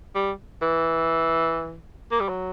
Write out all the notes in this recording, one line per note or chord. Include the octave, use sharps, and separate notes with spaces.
G3
E3
A#3
G3
F#3